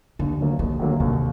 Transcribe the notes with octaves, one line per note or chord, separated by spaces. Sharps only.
D#2 D3
D3 F#3 A#3
D#2 D#3
D3 F#3 A#3
D#2 C3